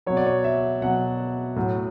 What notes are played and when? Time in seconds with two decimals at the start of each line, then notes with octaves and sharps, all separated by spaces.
0.06 B2 F#3 C#5
0.17 D5
0.26 C#5
0.44 E5
0.82 B2 F#3 F#5
1.56 A2 F#3